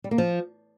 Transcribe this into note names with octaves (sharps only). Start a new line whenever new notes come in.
G3
A#3
F3